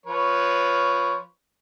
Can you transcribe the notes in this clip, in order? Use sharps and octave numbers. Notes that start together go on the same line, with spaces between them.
F3 B4 C#5